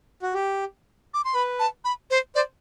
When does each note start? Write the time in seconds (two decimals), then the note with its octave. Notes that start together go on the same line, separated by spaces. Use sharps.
0.23 F#4
0.34 G4
1.14 D6
1.25 C6
1.35 B4 B5
1.59 A5
1.85 B5
2.11 C5
2.35 C5 D5